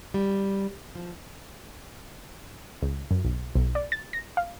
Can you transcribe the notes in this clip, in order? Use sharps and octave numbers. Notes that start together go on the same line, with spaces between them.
G3
F3
C#2
F#2
B1
B1
D5
A6
A#6
F5